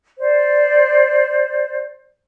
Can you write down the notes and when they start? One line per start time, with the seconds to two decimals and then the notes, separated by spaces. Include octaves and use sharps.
0.19 C5 D5